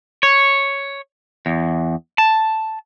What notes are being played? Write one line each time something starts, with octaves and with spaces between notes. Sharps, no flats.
C#5
E2
A5